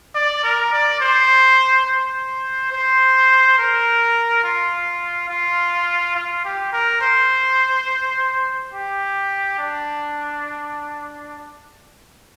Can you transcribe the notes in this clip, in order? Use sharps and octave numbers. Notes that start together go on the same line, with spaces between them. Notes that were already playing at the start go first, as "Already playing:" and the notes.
D5
A#4
D5
C5
C5
C5
A#4
F4
F4
F4
G4
A#4
C5
G4
D4